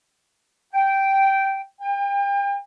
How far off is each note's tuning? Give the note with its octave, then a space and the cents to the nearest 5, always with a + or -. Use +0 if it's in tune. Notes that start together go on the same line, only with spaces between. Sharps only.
G5 -10
G5 +35